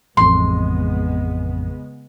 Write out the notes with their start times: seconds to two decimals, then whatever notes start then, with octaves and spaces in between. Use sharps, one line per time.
0.17 A1 F2 C#3 G#3 B3 C6